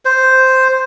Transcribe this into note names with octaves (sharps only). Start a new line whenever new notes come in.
C5